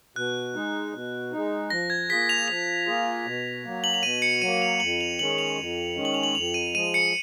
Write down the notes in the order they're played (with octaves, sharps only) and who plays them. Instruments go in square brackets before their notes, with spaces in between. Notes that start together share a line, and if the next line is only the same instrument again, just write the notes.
[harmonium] B2 [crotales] F#6
[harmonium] G#3 D#4
B2
G#3 D#4
[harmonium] F3 [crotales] A#6
[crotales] G#6
[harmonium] A#3 F4 G#4 [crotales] B6
[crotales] F7
[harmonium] F3 [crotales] F7
[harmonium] A#3 F4 G#4
B2
F#3 A#3
[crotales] F#7
F7
[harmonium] B2 [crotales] D#7
[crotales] C#7
[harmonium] F#3 [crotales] D#7
[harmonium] A#3
[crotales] F7
[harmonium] F2 [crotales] F#7
[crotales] F7
[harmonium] D#3 G#3 C#4 [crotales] F#7
[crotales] F7
[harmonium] F2
D#3 G#3 C#4
[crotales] F#7
F7
F#7
[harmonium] F2 [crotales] F7
[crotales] D#7
[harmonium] F3 G#3 [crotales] D#7
[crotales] C#7